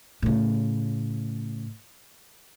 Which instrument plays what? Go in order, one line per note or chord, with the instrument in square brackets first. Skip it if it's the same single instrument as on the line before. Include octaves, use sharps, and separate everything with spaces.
[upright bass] A2 C#3